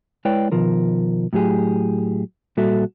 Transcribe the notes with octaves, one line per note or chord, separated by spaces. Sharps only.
G#3 E4 B4 C#5 D5 G5
B2 D#3 F3 A#4
A2 F#3 G4 G#4
A#2 G3 F#4 A4 E5